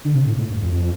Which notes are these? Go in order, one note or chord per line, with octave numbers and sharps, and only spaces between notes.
D3
C3
A2
A2
G2
F2